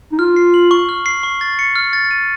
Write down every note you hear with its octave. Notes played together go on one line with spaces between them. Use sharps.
D#4
F4 F6
C7
F#7
C#6
F6
C7
C#6
A6
C#7
F6
A6
D#7